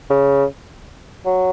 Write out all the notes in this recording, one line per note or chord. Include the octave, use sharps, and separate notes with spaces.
C#3
F#3